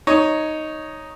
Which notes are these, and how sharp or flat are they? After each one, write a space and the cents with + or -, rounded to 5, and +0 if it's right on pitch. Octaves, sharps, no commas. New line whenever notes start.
D#4 +0 C#5 +0